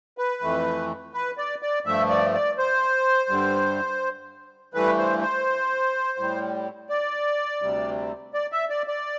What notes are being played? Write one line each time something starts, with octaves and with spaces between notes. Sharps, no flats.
B4
F2 E3 A3
B4
D5
D5
G2 F3 A3 E5
D5
D5
C5
G2 D3 G3
G2 E3 A3 B4
C5
C5
A2 G3
D5
D2 C3 G3
D5
E5
D5
D5